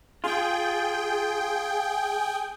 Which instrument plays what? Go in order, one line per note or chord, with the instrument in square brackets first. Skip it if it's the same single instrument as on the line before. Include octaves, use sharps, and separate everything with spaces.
[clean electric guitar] F4 [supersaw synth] G#4 G5